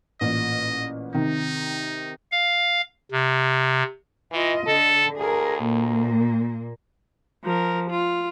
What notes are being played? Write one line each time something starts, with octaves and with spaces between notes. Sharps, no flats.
A1 A#2 D#5
C3 D#3 D#4
F5
C3
E3 F4 D#5
D3 A4
D2 G#4 A#4
A#2 A#3
F3 A#4
F4